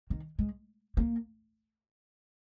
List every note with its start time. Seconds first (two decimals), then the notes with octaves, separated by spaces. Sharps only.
0.10 D#3
0.39 G#3
0.97 A#3